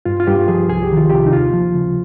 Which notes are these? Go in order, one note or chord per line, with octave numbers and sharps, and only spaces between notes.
G2 F4
F4
G2 G4
F3 G#4
C2 G#4
G4
D#3
F4
C3 G4
D#4
D#2 F4
F3
C#3